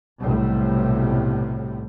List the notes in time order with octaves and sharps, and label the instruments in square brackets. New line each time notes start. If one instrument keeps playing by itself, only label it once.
[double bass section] B1 A2 C3 G3